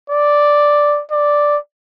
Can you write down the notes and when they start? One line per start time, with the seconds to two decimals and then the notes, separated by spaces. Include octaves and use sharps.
0.10 D5
1.11 D5